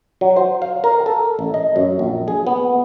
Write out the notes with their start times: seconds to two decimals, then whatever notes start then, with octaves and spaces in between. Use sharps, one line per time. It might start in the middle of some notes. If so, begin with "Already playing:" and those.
0.21 F#3
0.36 C5
0.62 F5
0.84 A#4
1.06 A4
1.39 A1
1.54 D#5
1.76 F#2
1.99 A#1
2.28 G#4
2.47 B3